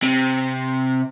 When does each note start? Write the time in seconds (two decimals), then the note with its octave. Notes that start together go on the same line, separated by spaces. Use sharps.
0.03 C3